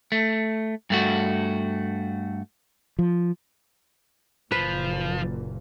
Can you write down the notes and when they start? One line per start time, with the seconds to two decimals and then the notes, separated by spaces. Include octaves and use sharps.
0.12 A3
0.90 G2 A3 F#4
2.99 F3
4.52 F#1 A#2 F3 B4